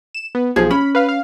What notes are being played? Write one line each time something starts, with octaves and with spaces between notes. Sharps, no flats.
E7
B3
B1 F3 G#4
C#4 B5
B4 F5
F5